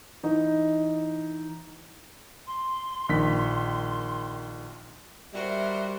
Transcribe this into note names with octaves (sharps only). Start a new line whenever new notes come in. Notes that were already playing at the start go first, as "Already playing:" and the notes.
E3 D#4 D#5
C6
A#1 D#3 B6
G3 F#4 A#4 C5 E5